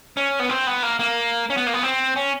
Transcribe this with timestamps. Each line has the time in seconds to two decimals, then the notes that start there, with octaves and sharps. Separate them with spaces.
0.17 C#4
0.39 B3
0.49 C4
0.67 B3
0.83 A#3
0.99 A#3
1.50 C#4
1.57 B3
1.67 A#3
1.74 B3
1.83 C4
2.16 C#4